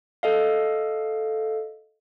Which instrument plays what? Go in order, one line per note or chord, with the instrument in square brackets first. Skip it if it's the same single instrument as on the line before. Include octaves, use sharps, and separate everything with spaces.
[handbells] A4 D#5 F5